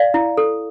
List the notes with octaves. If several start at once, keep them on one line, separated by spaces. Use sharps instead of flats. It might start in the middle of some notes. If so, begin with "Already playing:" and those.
Already playing: D5 F5
E4
A4